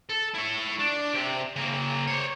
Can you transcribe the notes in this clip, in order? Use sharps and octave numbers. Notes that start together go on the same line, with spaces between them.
A4
E4 C#5
D4
C3 G4
C#3 A#3
C5 C#5